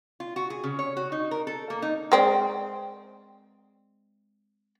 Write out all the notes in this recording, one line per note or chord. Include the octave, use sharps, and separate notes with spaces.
F4
F#4
G#4
C#3
C#5
F#4
D#4
A#4
A4
A#3
D#4
G#3 C4 D5